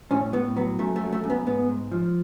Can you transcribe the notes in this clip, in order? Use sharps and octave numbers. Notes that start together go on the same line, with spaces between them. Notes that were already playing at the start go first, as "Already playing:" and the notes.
A2 C#4
A2 B3
F#3 B3
F#2 A3
A3
F#3
A3
F#2
B3
G#2 B3
G#2
F3